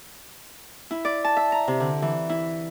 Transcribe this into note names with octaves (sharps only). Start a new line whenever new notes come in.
E4
D5
A5
E5
A#5
C3
D3
E3
E4